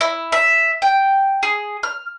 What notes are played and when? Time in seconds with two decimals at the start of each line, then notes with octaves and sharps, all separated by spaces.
0.01 E4
0.32 E5
0.82 G5
1.43 G#4
1.83 F6